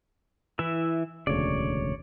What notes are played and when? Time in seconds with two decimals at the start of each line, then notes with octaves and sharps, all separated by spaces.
0.59 E3 E4 E5
1.27 E1 D2 C#3 C#5 D5